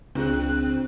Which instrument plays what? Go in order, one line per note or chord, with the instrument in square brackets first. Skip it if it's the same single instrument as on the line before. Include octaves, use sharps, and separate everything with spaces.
[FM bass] C#2 [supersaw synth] C4 [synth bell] D4 F4 G#4 [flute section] F#6